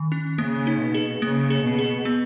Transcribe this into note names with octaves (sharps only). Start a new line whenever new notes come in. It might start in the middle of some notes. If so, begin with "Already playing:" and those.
Already playing: D#3
C#4
C#3 A#3
D#4
B2
G#4
C#3 A#3
G#4
B2
G#4
B3